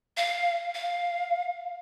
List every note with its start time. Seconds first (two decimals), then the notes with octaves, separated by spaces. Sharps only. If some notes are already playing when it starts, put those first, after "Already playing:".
0.17 F5
0.75 F5